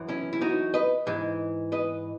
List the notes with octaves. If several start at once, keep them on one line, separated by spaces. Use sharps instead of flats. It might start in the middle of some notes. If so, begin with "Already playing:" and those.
Already playing: F#2 E3
C#4 E4
E4
D#4 F#4
B4 D#5
G#2 E3
B4 D#5